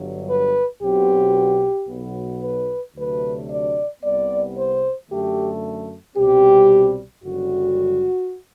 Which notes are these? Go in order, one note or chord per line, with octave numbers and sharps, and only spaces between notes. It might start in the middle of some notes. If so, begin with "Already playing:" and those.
Already playing: G1 G2 F#3
B4
B1 B2 F#3 C4 G4
B1 B2 F#3 B3
B4
D2 C3 F#3 A3 D4 B4
D5
C2 C3 G3 B3 D5
C5
F#2 D3 A3 G4
C2 B2 G3 C4 G4
F#1 F#2 D3 G3 F#4